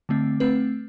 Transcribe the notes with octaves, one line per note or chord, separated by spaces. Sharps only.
D3 A3 C4
A3 C4 B4